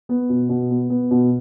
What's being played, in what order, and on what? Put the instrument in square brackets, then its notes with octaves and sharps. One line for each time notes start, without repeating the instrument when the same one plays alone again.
[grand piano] B3
B2
B2
B3
B3
B2